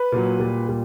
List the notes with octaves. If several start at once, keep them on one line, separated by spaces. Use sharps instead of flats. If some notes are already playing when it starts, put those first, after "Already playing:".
Already playing: B4
A#2 F#3
A#2 G3
A#2 G3